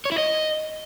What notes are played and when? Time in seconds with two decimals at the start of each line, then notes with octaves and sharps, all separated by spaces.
0.05 C#5
0.12 E4
0.18 D#5